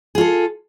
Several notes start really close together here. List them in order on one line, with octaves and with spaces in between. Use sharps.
G#4 F4 A4